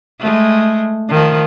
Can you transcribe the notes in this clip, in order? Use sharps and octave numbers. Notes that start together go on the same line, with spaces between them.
G#3 A3
D#3 F3